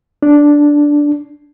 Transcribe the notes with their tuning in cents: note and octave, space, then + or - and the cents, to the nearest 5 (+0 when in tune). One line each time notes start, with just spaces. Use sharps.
D4 -5